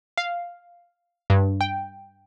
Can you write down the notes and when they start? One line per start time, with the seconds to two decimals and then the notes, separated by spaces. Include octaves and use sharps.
0.18 F5
1.30 G2
1.61 G5